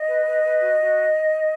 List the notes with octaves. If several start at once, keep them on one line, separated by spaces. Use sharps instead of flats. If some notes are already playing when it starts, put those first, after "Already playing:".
Already playing: D#5
B4
B4
B4
F#4
F#4